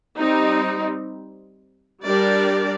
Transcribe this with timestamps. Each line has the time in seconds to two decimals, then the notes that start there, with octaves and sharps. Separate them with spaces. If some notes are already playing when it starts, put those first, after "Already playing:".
0.17 G3 C4 D#4
2.04 G3 D4 G4 A#4 D5